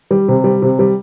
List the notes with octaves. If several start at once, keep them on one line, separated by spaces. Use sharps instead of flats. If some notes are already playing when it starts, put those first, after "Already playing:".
G3
C3
G3
C3
G3